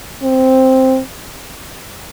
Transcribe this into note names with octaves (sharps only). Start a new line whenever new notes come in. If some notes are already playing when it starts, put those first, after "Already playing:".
C4